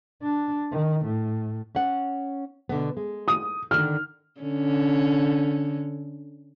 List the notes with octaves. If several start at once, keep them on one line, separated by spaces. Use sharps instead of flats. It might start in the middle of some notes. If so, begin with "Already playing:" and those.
D4
D#3
A2
C#4 F#5
B2 D3 B3
G#3
D#6
D3 D#3 F6
D3 C#4